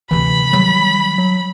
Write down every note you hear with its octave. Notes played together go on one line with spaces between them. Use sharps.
D2 C3 E3 B5
D#3 F#3 G3
F#3